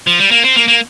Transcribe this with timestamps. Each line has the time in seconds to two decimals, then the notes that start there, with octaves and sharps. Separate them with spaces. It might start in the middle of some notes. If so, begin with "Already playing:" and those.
0.07 F3
0.19 G3
0.31 A#3
0.43 C4
0.56 A#3
0.68 A#3